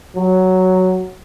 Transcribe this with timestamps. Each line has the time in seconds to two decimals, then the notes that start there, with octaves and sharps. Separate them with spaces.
0.16 F#3